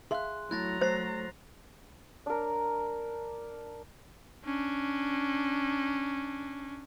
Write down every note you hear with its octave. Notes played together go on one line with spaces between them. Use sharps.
G#4 E5 F5 C6 F#6
F#3 A3 E4 A#5 F#6 A6 A#6
A3 C5 A6 C7
D4 A#4
C#4 D4